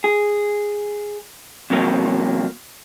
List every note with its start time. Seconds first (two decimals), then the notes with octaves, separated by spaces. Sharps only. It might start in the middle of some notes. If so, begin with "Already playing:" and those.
0.04 G#4
1.70 E2 C3 F#3 A#3